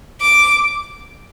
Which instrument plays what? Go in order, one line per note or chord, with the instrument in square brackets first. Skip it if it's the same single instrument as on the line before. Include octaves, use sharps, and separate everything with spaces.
[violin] D6